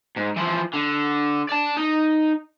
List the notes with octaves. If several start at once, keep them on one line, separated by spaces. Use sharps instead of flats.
G#2
E3 F3
D3
D5 A5
D#4